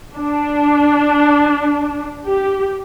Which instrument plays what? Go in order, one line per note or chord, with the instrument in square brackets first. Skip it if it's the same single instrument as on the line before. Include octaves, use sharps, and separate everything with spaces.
[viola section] D4
G4